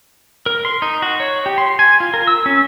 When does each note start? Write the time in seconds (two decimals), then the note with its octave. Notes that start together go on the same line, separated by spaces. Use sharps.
0.46 A#4
0.65 C6
0.82 D#4
1.02 F#4
1.20 C#5
1.46 G4
1.58 C6
1.79 G#5
2.00 F4
2.14 A#4
2.27 E6
2.46 C#4